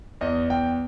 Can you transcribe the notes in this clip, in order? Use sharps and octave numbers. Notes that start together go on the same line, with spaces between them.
E2 D#5
E2 G5